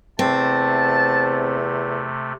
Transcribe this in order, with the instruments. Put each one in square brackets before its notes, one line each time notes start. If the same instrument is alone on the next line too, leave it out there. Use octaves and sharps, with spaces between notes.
[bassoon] E2 [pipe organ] C3 A3 [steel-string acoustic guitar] C4 [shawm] A5